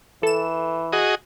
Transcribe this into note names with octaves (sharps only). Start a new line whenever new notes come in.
E3 A4 E7
F#4 G#4 D#5